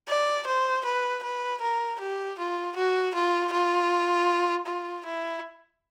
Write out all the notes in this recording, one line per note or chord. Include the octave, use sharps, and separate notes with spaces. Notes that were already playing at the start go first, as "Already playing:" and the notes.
D5
C5
B4
B4
A#4
G4
F4
F#4
F4
F4
F4
E4